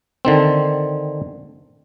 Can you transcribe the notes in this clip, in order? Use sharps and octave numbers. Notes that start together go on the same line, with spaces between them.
D3 D#3 C4